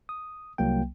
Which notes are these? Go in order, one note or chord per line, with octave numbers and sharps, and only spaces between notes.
D#6
C2 F#3 A#3 G5